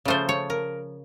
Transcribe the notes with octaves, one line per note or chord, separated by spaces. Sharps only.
C#3 F3 A3 C5
C#5
A#4